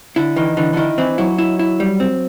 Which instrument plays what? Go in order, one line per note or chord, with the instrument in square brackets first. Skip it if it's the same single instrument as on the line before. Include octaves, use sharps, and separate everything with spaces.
[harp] D3 [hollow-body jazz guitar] E4
[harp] D#3 [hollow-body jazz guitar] E3
[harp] D3 [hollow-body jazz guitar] E3
[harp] D3 D#3 [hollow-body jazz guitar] E4
[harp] E3 [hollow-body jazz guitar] C4
[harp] F#3 [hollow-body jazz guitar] E4
[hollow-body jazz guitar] E4
E4
G3
C4